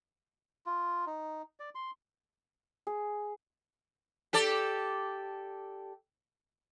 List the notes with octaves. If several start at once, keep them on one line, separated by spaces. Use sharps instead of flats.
F4
D#4
D5
C6
G#4
G4 A4 D5